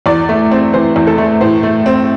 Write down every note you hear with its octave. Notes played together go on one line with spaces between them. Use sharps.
E2 D5
A3
C4
E3 C5
E2
A4
A3
A2 C5
A3
C4